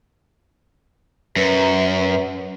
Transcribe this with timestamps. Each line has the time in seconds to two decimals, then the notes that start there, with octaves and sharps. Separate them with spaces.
1.36 F#2 B4